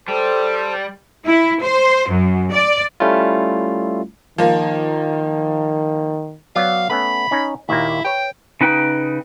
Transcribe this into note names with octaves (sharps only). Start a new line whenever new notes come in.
G3 A4 C5 A5
E4
C5
F#2
D5
G3 A3 C#4 E4 F4
D#3 F3 A#3
F#3 B3 D5 F5
A3 B3 C#4 B5
C#4 D#4
D#2 A#2 A#3 E4
B4 C#5 G5
C#3 D#4 B4 G5